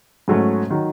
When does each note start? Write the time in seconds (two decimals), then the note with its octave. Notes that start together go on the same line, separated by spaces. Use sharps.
0.28 G#2 F#3 A3 C#4
0.70 D#3 F#3